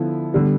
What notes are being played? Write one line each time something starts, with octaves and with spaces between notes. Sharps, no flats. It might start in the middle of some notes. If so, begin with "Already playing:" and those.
Already playing: D3 F3 B3 E4 A4
D3 G3 B3